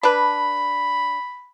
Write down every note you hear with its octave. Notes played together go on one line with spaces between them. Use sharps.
D4 B4 B5